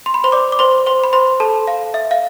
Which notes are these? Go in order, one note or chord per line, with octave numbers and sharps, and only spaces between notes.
C6
B5
C5 C6
D5 D6
D6
C5 C6
C5 C6
B5
C5 C6
A4 A5
F5
E5
F5